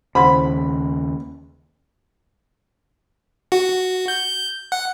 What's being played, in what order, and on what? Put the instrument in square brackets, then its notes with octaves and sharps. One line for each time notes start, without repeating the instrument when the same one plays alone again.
[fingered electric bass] D#2 C#3 [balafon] C5 F#5 C6 [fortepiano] B5
[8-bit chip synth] F#4
F#4
G6
F#5